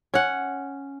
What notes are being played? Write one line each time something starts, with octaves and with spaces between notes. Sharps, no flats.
C#4 F#5